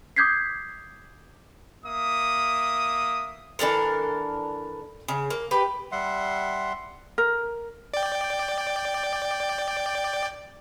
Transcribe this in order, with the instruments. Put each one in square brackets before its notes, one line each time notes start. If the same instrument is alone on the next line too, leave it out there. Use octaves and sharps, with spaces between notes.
[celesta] D6 D#6 G6 G#6 B6 C7
[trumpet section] A#3 E5 D#6
[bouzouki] E3 D4 A4 A#4
C#3
A#3
G4 B4 G5
[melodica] G3 E5 F#5 C6
[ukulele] A#4
[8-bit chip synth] D5 G5